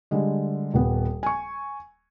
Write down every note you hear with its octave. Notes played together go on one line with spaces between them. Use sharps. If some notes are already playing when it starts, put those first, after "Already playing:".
D3 G3 G#3
D#1 B3
G#5 C#6